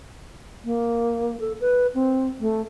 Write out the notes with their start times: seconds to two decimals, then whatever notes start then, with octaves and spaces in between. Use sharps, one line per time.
0.65 A#3
1.40 A4
1.61 B4
1.94 C4
2.40 A3